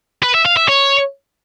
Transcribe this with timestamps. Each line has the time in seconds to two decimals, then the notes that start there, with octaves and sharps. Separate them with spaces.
0.23 B4
0.34 E5
0.46 F5
0.57 E5
0.68 C#5